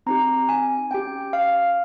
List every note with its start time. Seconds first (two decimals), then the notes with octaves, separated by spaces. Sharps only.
0.06 C4 D#4 G4 A#5
0.49 G#5
0.91 C#4 G4 G5
1.33 F5